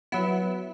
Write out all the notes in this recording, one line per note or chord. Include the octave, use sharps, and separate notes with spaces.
F#3 B3 E4